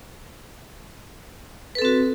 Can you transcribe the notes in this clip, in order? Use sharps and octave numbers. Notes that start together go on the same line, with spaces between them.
C4 F#4 A4 B4